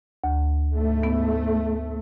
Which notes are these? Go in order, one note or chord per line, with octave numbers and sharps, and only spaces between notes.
D2
G#2 A3
B3